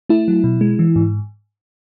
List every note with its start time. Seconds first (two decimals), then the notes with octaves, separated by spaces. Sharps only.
0.09 A3 E4
0.28 F#3
0.44 B2
0.61 G#3
0.79 E3
0.96 G#2